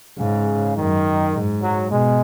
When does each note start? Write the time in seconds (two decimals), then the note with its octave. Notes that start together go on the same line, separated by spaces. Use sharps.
0.18 G#2 C#3
0.76 F#2 D#3
1.33 G#2
1.62 F#3
1.91 B2 G#3